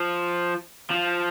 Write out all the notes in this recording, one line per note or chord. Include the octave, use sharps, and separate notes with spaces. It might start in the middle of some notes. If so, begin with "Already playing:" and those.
Already playing: F3
F3